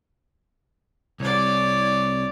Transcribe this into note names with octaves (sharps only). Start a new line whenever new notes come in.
C2 C#5 D5